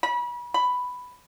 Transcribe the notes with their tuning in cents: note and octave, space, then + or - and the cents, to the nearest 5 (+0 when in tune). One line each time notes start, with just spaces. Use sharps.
B5 -35
B5 +5